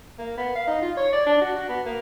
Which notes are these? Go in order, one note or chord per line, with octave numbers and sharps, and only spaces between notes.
A#3
B3
F5
D#4
F4
C#5
D5
D4
F#4
F#4
B3
A#3